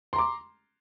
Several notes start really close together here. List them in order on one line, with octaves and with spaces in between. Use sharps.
C6 A#5 D6